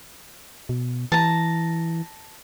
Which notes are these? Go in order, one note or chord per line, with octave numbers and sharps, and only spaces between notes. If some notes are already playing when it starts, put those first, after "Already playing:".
B2
E3 A5 A#5